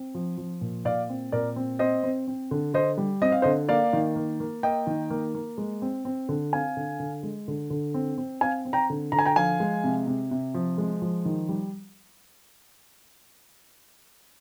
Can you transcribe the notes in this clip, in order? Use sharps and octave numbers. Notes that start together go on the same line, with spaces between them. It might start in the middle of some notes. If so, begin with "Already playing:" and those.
Already playing: C4
F3
F3
A#2
A#2 D5 F5
C4
A#2 A#4 D5
C4
C4 C5 D#5
C4
C4
D3
D3 C5 D#5
G3
C4 D#5
F5
D3 C5 D#5
A#3 D5 F5
D#3
A#3
A#3
A#3 D#5 G5
D#3
A#3
A#3
G#3
C4
C4
D3
C4 F5 G#5
D3
D3
G#3
D3
D3
C4
C4
C4 F5 G#5
C4
G5 A#5
D3
D3 A#5
G#5
G5 A#5
F3 F5 G#5
G#3
C3
C3
C3
F3
G#3
F3
D#3
G3